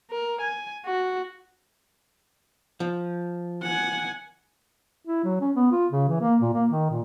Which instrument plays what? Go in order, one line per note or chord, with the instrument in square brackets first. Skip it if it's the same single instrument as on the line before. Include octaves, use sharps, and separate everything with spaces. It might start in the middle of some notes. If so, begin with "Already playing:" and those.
[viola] A#4
G#5
F#4
[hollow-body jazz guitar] F3
[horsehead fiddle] F#5 G#5
[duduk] E4
F#3
C#4
B3
F4
C#3
E3
A#3
A#2
A#3
D#3
A#2